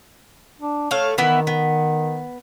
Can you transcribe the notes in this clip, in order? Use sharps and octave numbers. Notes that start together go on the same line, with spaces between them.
D4
A3 C#5 F5
D#3 E3 B3 E4
B3